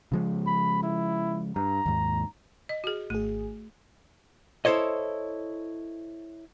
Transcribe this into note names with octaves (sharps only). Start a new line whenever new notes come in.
C#3 F3 G#3
B5
E4
G2 A#5
D#2 G#2
D#5
F#4 G#4
G#1 A3 G#4
E4 A4 C5 C#5 D#5